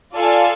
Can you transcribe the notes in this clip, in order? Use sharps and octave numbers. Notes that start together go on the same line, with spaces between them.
F4 A4 D5 F5 G#5